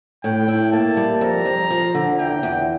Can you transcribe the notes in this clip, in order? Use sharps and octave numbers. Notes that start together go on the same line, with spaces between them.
A2 G5
E4
A#3 A5
G3
F2 A#5
F2
F3
D3
E2 G5
E2